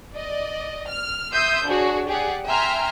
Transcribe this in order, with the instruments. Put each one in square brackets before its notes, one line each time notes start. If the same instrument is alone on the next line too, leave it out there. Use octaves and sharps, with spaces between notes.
[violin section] D5 D#5
F6
E5 C6 D#6 E6 G6
D4 F#4 G#4 C#5
G4 G#4 D5 F#5
E5 G5 G#5 A#5 C6 F6